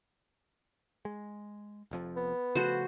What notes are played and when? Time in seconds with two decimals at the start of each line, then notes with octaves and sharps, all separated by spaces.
1.05 G#3
1.91 F1 F2 F3
2.17 B3
2.55 C#3 F3 A3 F#4 C5